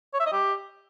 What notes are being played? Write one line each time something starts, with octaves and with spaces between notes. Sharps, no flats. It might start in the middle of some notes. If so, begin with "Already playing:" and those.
C#5
E5
D#5
G4